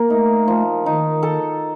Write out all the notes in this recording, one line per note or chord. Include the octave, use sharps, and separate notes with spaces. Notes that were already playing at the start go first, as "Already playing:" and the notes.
Already playing: A#3
A3 D#4
F3
D#3 D#4
A4